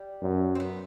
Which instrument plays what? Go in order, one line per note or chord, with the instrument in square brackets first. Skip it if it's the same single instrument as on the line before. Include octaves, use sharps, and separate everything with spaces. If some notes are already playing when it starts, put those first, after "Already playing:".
Already playing: [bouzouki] G3
[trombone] F#2
[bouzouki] C4
B3